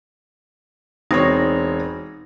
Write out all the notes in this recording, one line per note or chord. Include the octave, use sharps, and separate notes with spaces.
E1 C4 D#4 C#5